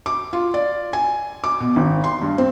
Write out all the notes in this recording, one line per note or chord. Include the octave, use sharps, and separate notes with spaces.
D6
F4
D5
G#5
D6
B2
G#1
C6
G2
C4